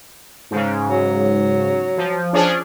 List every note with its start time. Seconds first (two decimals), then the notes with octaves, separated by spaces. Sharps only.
0.51 G#2 C#3
0.88 F#3
1.97 F3
2.33 F3 C#4 D4 G#4